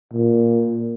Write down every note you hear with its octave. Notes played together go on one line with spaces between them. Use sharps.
A#2